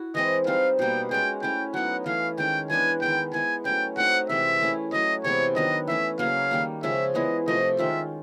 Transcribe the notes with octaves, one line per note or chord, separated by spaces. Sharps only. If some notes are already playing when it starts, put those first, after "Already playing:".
Already playing: E4 F#4
E3 G#3 C4 D#5
G3 C4 D#4 F5
B2 G3 A#3 G5
G#3 C#4 F#4 G5
A3 C#4 E4 G5
F#3 B3 D#4 F#5
E3 A3 C#4 F5
D#3 G#3 C#4 G5
E3 G#3 B3 D4 G#5
D#3 G#3 B3 G5
G#3 B3 E4 G#5
F#3 A3 C#4 G5
A3 C4 D#4 F#4 F#5
C3 E3 G#3 C4 E5
A3 C#4 E4 G#4
F#3 A3 C#4 D#5
C3 E3 G#3 B3 C#5
D#3 F#3 B3 D4 D#5
E3 A3 C#4 E5
C#3 F#3 A#3 C#4 F5
D#3 G3 A#3
C#3 F3 G#3 C#4 E5
E3 G#3 B3 E4 D#5
C3 F3 A3 D#5
D#3 G#3 C#4 F4 E5